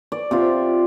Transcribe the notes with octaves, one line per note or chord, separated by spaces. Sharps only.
D5
C3 F4